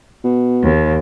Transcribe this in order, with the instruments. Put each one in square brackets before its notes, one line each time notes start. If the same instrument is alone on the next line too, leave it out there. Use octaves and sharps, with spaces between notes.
[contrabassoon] B2
[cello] D#2